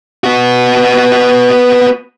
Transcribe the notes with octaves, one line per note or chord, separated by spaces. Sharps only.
B3 F#4